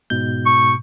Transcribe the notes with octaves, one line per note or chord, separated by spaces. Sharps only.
G#2 B2 G6
C#6